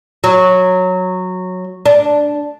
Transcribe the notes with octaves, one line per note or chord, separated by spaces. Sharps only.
F#3
D4